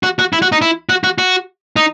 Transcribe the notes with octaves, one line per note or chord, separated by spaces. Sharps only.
F#4
F#4
E4
F#4
D#4
E4
F#4
F#4
F#4
D#4